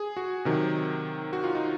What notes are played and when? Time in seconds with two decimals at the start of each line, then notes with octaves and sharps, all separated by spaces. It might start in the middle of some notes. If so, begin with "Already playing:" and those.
Already playing: G#4
0.17 F#4
0.45 C3 D#3 F#3
1.33 F#4
1.44 F4
1.55 D#4